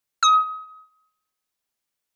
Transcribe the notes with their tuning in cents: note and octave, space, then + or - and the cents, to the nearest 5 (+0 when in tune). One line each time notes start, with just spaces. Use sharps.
D#6 +25